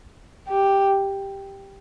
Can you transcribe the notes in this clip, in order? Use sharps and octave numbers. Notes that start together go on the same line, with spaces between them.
G4